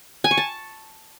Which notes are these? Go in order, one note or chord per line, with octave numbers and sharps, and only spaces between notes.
G#5
C#6
A5